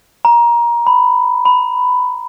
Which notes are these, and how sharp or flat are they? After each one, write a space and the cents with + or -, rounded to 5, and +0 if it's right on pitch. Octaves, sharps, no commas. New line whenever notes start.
A#5 +20
B5 +10
B5 +15